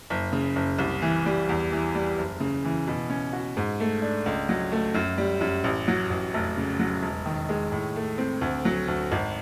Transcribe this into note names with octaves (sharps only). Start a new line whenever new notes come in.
F#1
C#3
F#1
C2
E3
G3
E2
E3
G3
F#1
C#3
E3
B2
C#4
F#4
G#2
A3
D4
C#2
F#3
A3
F#2
G3
F#2
A1
F#3
A1
F1
C#3
F#3
E1
D#3
G#3
A2
A3
C4
D2
F#3
D2
G#1